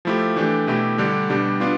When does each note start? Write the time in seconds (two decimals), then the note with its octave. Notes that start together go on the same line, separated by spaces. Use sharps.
0.05 F3 A3 E4 G4
0.36 E3 A3 D4 G4
0.67 B2 A3 E4 G4
0.98 D3 G3 D4 G4
1.29 B2 G3 D4 G4
1.60 B3 D4 F4